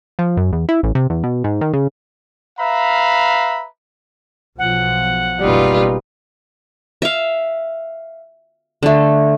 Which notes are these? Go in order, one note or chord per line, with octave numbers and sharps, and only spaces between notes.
F3
F#2
E2
E4
A1
C3
E2
B2
G#2
D#3
C#3
B4 E5 F5 A#5 B5
B1 F3 F#5
F#1 B2 G3 D#4 F4 B4
E5 F5
D3 A3